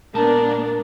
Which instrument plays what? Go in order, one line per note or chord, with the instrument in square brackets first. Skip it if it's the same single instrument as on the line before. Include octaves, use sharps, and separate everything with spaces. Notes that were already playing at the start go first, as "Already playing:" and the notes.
[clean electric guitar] A#2 G#3 A5 [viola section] A#3 B3 D4 [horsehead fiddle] A#4